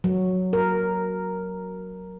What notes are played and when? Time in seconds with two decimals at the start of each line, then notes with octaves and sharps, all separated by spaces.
0.04 F#3
0.53 A#4